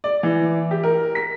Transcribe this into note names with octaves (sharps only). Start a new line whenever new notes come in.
D5
E3
G4
A#4
B6